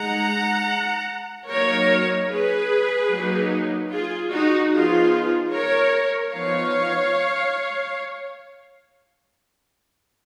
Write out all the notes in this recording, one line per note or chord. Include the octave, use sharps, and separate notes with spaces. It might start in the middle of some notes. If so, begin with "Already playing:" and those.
Already playing: G#3 D#4 F#5 A#5
F#3 A#3 D#4 A#4 C#5
G#4 B4
F#3 A#3 D#4
F4 G#4
D#4 F#4
F3 B3 D#4 F4 G#4
A#4 C#5
F3 B3 D#4 C#5 F5